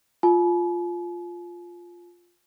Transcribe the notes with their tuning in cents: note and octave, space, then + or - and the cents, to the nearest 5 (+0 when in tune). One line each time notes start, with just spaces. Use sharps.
F4 +0 G#5 +45